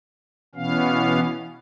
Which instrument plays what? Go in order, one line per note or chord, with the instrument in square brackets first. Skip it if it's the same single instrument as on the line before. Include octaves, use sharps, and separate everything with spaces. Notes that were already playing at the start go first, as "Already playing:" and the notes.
[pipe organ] B2 E3 B3 C#4 F5